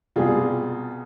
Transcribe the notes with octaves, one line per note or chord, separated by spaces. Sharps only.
C2 B2 G3 F4 G#4